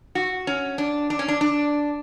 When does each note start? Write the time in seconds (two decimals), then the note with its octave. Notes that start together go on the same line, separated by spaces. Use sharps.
0.15 F#4
0.47 C#4
0.78 D4
1.10 D4
1.19 C#4
1.28 D4
1.41 D4